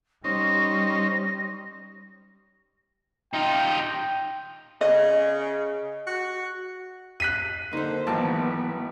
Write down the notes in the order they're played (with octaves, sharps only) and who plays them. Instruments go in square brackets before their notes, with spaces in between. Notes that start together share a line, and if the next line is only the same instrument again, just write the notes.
[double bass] G3 [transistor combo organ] C#4 D#4 C5 [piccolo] A#6
[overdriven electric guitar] D#4 F4 [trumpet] G5
[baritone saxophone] C#3 [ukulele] D#5
[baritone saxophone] F#4
[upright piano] F#6 B6 D#7
[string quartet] D3 C5 [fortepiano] A#3 [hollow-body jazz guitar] D#4 A4
[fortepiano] G#1 A5 [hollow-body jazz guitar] E3 F#3 A#3 [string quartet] B3